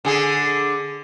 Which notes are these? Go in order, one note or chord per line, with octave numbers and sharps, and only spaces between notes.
D3 G#4